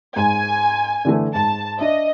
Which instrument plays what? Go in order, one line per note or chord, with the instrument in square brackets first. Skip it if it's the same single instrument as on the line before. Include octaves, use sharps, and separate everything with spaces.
[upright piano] G#2 [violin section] G#5
[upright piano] D3 E3 A3
[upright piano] G#2 [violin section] A5
[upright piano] D4 E5 [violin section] D#5